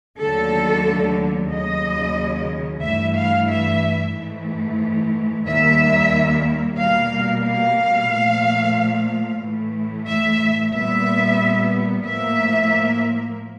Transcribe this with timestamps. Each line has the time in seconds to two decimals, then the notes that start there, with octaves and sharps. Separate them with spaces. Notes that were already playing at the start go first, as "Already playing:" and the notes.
0.19 D#2 D3 F#3 A3 A4
1.50 D#2 C#3 F#3 D#5
2.82 G2 E3 A3 E5
3.15 F5
3.48 E5
4.14 G#2 E3 A3
5.46 D#2 D#3 G3 A#3 E5
6.78 B2 G3 A#3 F5
7.44 F5
8.10 A#2 F3 A3
9.42 A2 E3 A3
10.08 E5
10.73 A#2 G3 B3 E5
12.06 A2 F3 A#3 E5